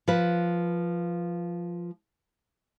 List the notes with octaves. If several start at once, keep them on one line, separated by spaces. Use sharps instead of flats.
F3 B4